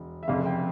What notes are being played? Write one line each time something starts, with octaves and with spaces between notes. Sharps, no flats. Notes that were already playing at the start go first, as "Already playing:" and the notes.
Already playing: E1
E5
F1 F2 C#3 F5
G5